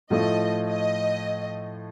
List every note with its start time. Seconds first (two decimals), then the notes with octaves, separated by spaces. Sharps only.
0.10 A2 F3 A3 D#5
0.66 D#5